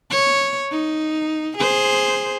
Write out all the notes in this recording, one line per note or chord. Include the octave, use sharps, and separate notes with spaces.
C#5
D#4
G#4 C5